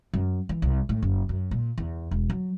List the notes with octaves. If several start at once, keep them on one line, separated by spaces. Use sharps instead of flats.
F#2
E3
C2
A2
F#1
F#2
A#2
E2
E1
F#3